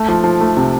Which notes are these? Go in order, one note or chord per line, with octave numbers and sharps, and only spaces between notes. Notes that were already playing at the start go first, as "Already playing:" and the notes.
Already playing: A3
F3
F3
A3
C3